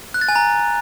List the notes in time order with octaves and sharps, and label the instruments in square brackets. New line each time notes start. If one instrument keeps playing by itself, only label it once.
[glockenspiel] F#6
A6
G#5
A#5